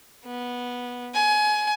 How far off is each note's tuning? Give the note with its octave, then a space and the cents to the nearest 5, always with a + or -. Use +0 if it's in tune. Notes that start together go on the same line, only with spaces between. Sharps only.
B3 -10
G#5 +25